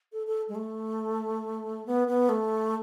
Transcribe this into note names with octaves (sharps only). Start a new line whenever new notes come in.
A4
A4
G#3
A3
B3
B3
A3